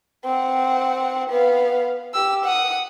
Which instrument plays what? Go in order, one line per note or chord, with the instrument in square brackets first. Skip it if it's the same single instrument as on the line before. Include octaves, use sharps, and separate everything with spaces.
[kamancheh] C4 F#5
B3 F5
G4 E6
F#5 D#6